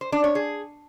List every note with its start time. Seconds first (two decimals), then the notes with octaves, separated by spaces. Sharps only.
0.01 C5
0.12 D4
0.24 C#5
0.35 G#4